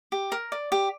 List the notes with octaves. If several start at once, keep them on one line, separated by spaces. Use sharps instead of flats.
G4
A#4
D5
G4